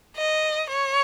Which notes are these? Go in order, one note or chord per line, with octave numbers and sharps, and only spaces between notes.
D#5
C#5